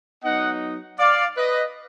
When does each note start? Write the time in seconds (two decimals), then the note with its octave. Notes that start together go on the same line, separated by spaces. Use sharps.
0.23 F#3 B3 D#4 D#5 F#5
0.99 D5 F5
1.37 B4 D#5